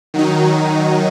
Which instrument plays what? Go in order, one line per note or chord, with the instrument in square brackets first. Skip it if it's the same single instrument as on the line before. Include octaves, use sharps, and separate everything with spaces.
[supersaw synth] D#3 F#3 D#4